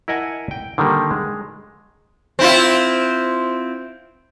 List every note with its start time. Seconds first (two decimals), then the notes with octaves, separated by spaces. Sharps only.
0.08 E4 A#4 D#5 F#5 G#5 A5
0.51 G5
0.78 D3 D#3 G3 A#3
1.11 G#3
2.39 C4 E4 F4